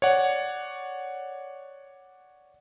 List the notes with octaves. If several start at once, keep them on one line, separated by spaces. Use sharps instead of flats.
C#5 D5 F#5